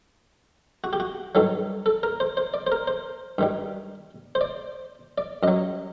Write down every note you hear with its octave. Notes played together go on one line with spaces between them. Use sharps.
F#4
G4
F#4
G2 D#3 F#3 A4
A4
A#4
C5
C5
D5
C5
A#4
C5
G2 D#3 G3
C5
D5
D5
F#2 F#3 D#5